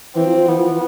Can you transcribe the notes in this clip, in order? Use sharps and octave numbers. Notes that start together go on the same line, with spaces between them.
E3 C4
F3
F3
E3 B3
F3
E3